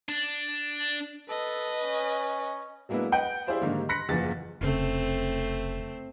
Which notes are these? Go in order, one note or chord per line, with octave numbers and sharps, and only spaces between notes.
D4
A4 B4 D#5
C#4
F#3 G#3 A#3 B3 D4 E4
B4 D#5 F#5 G5
E4 G4 G#4 C5 D5 F5
G#2 D3 D#3 G3 A#3
B5 C6 F#6 A#6 B6 C#7
F#1 E2 F3 A#3 G#4 A6
F1 C#3 A3 C4